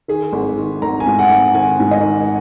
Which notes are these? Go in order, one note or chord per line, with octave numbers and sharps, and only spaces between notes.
D#3 G#4
G#1
D#3
G#1 A#5
G#5
G#2
F#5
G#1
D#3 G#5
G#2
D#5
D#3